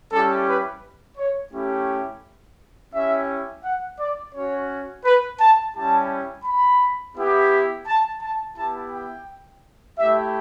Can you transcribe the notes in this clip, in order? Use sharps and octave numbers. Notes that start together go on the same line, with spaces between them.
G3 C#4 E4 G4 A4
B4
C#5
A3 C#4 E4 G4
C#4 E4 G4 E5
F#5
D5
C#4 F#4 C#5
B4
A5
G3 C#4 E4 G4 A5
B5
B3 E4 G4
A5
A5
B3 E4 G4 A5
G5
A3 E4 G4 E5